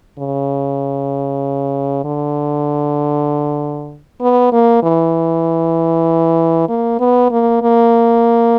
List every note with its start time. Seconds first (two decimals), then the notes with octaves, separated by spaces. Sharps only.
0.19 C#3
2.05 D3
4.21 B3
4.52 A#3
4.83 E3
6.69 A#3
7.00 B3
7.31 A#3
7.62 A#3